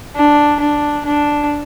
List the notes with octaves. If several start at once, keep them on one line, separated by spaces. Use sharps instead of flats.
D4
D4
D4